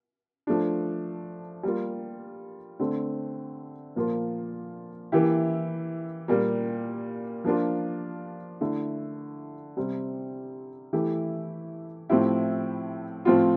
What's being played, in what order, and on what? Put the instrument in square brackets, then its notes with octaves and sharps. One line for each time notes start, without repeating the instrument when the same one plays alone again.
[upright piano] F3 A3 D4
G3 A#3 F4
D3 A3 C4
A#2 F3 A#3 F4
E3 A#3 E4 G4
A#2 G3 A#3
F3 A#3 D4 F4
D3 A3 E4
C3 G3 C4
E3 A3 E4 G4
A2 F3 C4 E4 G4
A2 F3 C4 F4